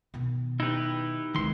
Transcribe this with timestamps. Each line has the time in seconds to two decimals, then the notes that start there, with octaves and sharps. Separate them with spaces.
0.14 B2 D#3
0.60 D#4 E4 G4 B4
1.35 C#2 D#3 C4 C6